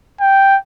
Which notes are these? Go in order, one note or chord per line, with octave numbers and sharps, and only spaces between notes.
G5